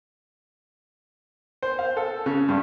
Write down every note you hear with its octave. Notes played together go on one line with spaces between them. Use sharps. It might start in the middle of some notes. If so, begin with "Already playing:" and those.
C5
F5
A4
C#3
G2